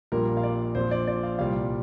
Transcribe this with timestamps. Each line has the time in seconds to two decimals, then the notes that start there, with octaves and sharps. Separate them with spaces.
0.12 A#1 A#2 G3 A#3 A#4
0.37 F5
0.43 D5
0.75 A#1 A#2 F3 C5
0.91 D5
1.07 D5
1.23 F5
1.39 C2 A#2 G3 F5